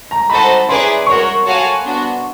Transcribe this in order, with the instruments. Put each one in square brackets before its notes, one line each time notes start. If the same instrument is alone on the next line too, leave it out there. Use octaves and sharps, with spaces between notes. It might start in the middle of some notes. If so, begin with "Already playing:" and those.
[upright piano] A#5
[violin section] D#4 F#4 A4 C5 [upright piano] B5
[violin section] C#4 E4 G#4 B4 D5 [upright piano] C6
[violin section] F#4 A#4 C#5 [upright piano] C#6
[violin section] F#4 A4 C#5 F5 G#5
B3 D4 F#4